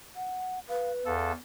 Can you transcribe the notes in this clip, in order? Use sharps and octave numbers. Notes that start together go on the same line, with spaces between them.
F#5
B4 F5
E2 A4 F5